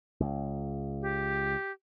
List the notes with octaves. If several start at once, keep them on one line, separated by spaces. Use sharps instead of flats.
C#2
G4